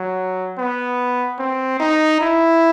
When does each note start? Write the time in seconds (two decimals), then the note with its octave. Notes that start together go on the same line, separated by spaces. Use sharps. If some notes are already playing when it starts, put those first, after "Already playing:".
Already playing: F#3
0.58 B3
1.38 C4
1.80 D#4
2.21 E4